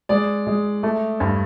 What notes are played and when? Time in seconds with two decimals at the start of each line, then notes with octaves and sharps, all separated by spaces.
0.09 G#3 D5
0.47 G#3
0.83 A3
1.20 G2